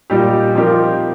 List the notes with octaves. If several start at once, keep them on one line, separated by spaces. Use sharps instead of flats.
A#2 G3 D#4 G4
F3 C4 D#4 G4 A#4